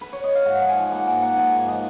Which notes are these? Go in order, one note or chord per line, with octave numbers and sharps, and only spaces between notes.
B4
C#5
D#5
F5
G#2 F#5
F3
G#5
F3
A#3 F#5
G#2 G#5
A#3 F#5
F3 G#5
G#2 G#5
F3 D#5